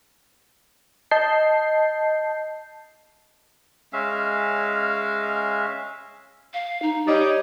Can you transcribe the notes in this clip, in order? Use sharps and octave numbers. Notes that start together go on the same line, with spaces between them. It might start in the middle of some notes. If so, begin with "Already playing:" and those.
D#5 A5 G6 C7
G#3 C#4 E5 F5
F5
D#4
G3 D#4 C#5